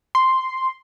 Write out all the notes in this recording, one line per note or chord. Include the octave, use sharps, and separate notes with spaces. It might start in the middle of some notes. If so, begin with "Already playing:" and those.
C6